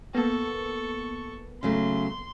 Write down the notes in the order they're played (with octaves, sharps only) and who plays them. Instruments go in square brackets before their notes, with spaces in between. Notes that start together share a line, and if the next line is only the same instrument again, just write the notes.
[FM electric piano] A#3 B3 [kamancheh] A4 C#6
[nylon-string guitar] C#3 F#3 A3 [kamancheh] C6